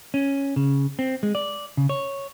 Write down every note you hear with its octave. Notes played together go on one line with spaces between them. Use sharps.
C#4
C#3
C4
G#3
D5
C#3
C#5